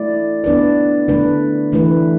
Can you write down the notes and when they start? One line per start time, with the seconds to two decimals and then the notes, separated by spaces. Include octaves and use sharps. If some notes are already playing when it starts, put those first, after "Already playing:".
Already playing: A3 E4 D5
0.44 B3 D4 B4 D5
1.08 D3 A3 D4 B4
1.72 E3 A3 E4 B4